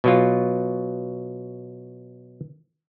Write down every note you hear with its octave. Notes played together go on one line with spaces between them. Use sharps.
B2 F#3 F4